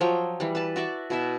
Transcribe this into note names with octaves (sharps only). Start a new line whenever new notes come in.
F3 F#3 C#5 G5
E3 G3
B4 A5
F#4 D5 E5
B2 E4 E5